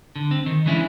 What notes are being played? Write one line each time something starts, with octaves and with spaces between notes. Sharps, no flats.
D3
C4
D#3
E3 G#3 C#4 D4 E4